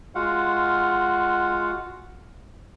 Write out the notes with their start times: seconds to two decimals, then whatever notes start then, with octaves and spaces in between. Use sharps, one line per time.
0.15 G#3 F4 F#4 F5 F#5